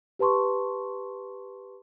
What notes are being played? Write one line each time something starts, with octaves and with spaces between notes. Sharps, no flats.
G4 B4 A5 C6 C#6